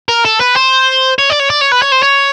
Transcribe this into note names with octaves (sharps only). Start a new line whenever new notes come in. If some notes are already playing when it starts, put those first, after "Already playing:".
A#4
A4
B4
C5
C#5
D5
C#5
D5
C#5
B4
C#5
C5
C#5